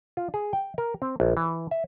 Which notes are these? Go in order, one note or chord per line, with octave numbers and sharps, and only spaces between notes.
F4
G#4
G5
A#4
C4
A#1
E3
E5